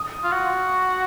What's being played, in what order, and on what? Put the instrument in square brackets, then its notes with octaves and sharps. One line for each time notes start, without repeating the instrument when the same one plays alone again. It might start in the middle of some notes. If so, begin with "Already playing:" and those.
Already playing: [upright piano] D#6
[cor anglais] F4
F#4